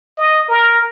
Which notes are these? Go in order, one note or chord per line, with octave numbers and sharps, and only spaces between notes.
D#5
A#4